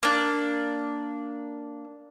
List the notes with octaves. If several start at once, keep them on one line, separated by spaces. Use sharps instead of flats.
A#3 D4